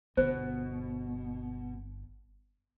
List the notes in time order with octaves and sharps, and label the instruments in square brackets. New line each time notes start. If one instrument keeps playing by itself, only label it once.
[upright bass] G1 [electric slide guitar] B2 [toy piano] C5